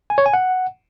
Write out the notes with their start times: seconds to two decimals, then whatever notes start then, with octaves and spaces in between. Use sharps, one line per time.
0.10 G#5
0.18 C#5
0.26 G#5
0.33 F#5